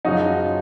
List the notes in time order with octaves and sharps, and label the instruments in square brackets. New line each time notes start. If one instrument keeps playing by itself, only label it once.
[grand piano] F#2 C#3 F3 D#4 F#4